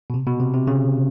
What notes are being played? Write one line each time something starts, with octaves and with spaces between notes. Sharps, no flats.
B2
C3
B2
C3
C3
C#3